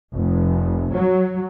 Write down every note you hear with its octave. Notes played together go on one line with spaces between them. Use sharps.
F1
F#3